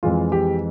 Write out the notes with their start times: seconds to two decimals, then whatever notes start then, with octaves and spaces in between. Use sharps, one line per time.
0.03 F2 E3 G#3 F4
0.32 G4